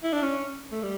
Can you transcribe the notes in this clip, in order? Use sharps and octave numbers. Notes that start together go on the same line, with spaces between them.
E4
D4
C#4
A3
G3